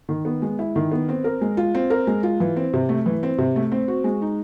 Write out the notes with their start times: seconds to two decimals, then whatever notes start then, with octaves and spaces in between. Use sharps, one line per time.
0.09 D#3
0.25 B3
0.42 G#3
0.59 E4
0.76 D#3
0.92 B3
1.09 C4
1.24 A#4
1.41 G#3
1.57 F4
1.75 C4
1.90 A#4
2.07 G#3
2.23 F4
2.40 E3
2.56 C4
2.73 C3
2.89 A3
3.06 E3
3.23 C4
3.38 C3
3.56 A3
3.72 C4
3.88 F#4
4.04 G#3
4.22 D#4